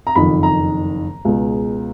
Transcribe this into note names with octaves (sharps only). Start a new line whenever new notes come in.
A#5
F#1 F2 D#3 B5
A#5
C#2 B2 G#3